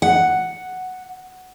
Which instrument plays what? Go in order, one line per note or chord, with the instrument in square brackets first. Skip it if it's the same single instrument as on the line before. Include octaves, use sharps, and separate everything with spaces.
[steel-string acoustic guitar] F#5